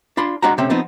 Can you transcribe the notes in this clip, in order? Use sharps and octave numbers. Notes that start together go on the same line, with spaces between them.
D4 F4 B5 C6
G#3 D4 F#4 F#5 A#5
C3 A3 C4 C#4
F3 B3 C4 D#4